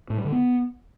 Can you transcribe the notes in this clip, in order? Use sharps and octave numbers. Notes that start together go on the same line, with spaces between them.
A2
G3
D3
B3